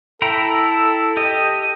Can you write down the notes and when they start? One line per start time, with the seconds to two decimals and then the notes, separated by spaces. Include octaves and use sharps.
0.22 E4 A4 G5 A#5
1.17 G4 D#5